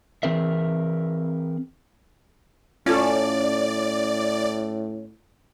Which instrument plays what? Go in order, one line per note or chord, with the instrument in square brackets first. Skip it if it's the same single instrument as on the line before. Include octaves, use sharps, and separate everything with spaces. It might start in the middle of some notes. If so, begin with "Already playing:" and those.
[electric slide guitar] E3 C4 G#4 A#4 E5
[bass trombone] A2 [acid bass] C#4 [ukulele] F4 A4 [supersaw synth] D5